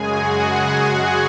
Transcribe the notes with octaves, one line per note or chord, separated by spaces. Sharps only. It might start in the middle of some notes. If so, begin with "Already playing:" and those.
Already playing: F#2 C#3 G#3 G#4 G#5
F#4 F#5
F#4 F#5